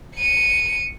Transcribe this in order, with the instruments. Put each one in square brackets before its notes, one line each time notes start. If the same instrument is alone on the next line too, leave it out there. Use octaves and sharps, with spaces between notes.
[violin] C#7 D#7